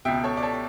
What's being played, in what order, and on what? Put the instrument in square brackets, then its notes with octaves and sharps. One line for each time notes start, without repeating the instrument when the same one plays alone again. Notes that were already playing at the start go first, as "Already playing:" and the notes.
[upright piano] C#2 B2 E5 G5
A4 C#5
D5
A4 C#5